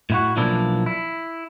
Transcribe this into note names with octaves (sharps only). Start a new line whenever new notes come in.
A2 E4 F#4
B1 E3 F3 A#3 D4 E4
E4